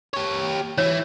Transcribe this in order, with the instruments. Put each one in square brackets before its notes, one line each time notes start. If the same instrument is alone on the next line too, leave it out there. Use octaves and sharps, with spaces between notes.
[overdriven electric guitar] G4 C#5
[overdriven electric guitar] E3 E4 [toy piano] C#5